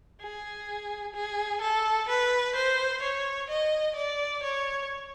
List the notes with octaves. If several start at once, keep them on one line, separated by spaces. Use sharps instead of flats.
G#4
G#4
A4
B4
C5
C#5
D#5
D5
C#5